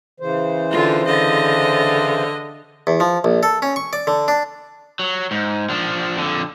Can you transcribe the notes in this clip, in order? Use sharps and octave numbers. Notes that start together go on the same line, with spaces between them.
C#3 E3 C5
D3 F4
D3 D#5
E2
F3
A#1
A4
C#4
C#6
D5
D3
D4
F#3
G#2
F3 D4
F2 D3